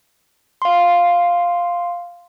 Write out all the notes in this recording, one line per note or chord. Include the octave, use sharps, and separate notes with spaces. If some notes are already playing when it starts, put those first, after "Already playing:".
F5 C6